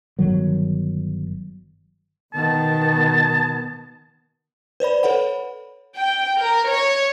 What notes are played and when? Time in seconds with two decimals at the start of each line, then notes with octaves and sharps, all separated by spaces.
0.19 G1 D#3 F#3
2.34 B2 D#3 B3 A5
4.80 B4 C5 D5 B5
5.03 A4 B4 C#5 F#5 B5
5.96 G5
6.39 A#4
6.68 C#5